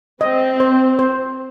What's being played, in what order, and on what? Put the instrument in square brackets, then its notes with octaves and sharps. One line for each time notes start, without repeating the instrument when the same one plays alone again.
[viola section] C4 [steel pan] D#5
[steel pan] C5
C5